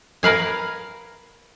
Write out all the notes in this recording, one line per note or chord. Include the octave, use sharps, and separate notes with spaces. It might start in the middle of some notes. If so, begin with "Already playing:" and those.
A#4 B4 F5 G#5